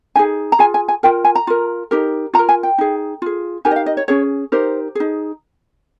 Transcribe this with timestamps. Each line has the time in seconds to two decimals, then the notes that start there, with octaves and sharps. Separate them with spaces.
0.15 D#4 G#4 G#5
0.52 A#5
0.59 F4 G#4 G#5
0.74 G#5
0.88 G#5
1.03 F4 A#4 G5
1.25 G#5
1.35 A#5
1.47 F4 A#4
1.91 D#4 G4 A#4
2.34 F4 A#5
2.39 A#4
2.49 G#5
2.63 G5
2.78 D#4 G#4
3.22 F4 G#4
3.65 D#4 G4 A#4 G#5
3.71 D#5
3.76 F5
3.86 D#5
3.97 C#5
4.08 C#4 G#4 C#5
4.52 D#4 G4 A#4 C5
4.95 D#4 G#4